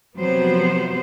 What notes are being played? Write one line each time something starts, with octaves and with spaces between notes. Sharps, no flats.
C3 F3 F#3 B3 C5